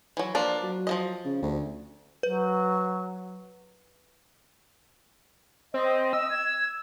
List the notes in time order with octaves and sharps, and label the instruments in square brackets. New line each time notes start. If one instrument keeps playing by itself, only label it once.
[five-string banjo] E3 F#3
F3 A#3 D4
[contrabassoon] F#3
[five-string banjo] F3 A#3 D#5
[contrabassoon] C#3
D2
[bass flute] F#3 [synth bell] B4
[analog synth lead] C4 [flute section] D#5
[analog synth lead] E6
[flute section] G#6